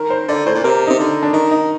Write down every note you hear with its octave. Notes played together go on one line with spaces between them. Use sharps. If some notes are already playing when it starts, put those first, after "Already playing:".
Already playing: D#3 A#4
C5
D3 D5
A2 C5
A#2
C3 A#4
C3 D#4
D3
D4
D#3 D#4
D#4